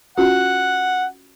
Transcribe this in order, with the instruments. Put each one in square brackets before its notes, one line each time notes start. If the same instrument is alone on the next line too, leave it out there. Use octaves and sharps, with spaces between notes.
[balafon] C#4 F4 F#4 [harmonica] F#5